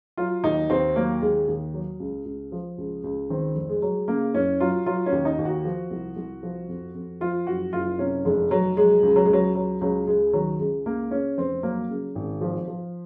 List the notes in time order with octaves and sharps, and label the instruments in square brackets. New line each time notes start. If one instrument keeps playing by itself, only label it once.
[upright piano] F#3 F4
D#2 D#4
D#2 C4
F#3 A#3
D#2 G#3
D#2
F#3
C#2
C#2
F3
C#2
C#2
D#3 C4
F1
G#3
F#3
C#3 A#3
F#1 C#4
F#3 F4
F#3 F4
C#4
D#2
D#4
D#2
F#4
F3
C2
C2
F3
F2
F2
F3 F4
F#1 F#4
F#1 F4
C3 C#4
F1 G#3
F1 F#3
F#3 G#3
C#2
F#3
G#3
C#2 F#3
F#3
C#2 F#3
C#2 G#3
D#3 F#3
C#2 G#3
C#2 A#3
C#3 C#4
F1 C4
F#3 A#3
C#3
G#1
F3
F3